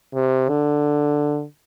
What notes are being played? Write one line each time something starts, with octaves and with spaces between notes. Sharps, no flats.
C3
D3